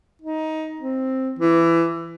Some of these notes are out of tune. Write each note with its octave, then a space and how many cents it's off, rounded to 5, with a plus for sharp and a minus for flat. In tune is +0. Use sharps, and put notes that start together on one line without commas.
D#4 +15
C4 +5
E3 +20